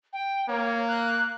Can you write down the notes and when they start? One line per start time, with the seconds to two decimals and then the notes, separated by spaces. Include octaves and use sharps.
0.13 G5
0.49 A#3 C#5
0.88 F#6